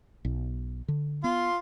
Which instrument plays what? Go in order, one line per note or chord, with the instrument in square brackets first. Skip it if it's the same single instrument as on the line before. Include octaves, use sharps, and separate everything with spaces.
[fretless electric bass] B1
D3
[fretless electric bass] B3 [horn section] F4 C6